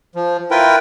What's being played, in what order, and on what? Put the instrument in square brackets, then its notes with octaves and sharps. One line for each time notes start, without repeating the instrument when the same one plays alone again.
[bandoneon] F3
E4 F4 A#4 B4 G5